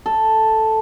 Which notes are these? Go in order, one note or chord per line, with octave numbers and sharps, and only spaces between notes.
A4